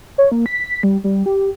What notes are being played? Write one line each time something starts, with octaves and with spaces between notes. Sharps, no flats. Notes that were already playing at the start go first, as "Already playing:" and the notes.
C#5
A#3
B6
G3
G3
G4